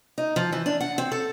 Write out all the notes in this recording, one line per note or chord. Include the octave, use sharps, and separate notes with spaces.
D#4
F3
E3
D4
F#5
C4
A4